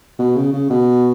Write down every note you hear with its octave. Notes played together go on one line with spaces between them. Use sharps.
B2
C#3
C#3
B2